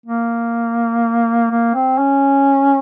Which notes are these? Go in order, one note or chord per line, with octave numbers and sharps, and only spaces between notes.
A#3
A#3
C4
C#4